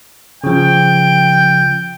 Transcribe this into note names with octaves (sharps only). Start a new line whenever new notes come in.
C#3 F3 G5